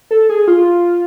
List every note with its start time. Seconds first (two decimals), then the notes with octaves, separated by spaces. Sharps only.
0.11 A4
0.29 G#4
0.48 F4